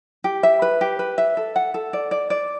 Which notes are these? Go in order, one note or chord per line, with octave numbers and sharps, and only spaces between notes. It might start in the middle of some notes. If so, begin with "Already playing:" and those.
G4
E5
B4
G4
B4
E5
A4
F#5
A4
D5
D5
D5